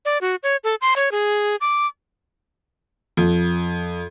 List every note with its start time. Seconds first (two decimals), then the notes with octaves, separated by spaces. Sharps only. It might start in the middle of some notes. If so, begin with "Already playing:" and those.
0.05 D5
0.21 F#4
0.43 C#5
0.64 A4
0.81 C6
0.96 C#5
1.12 G#4
1.61 D6
3.17 F2